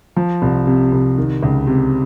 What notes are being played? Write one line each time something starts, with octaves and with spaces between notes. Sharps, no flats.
F3
C2
C3
C2
D#3
C#2
C3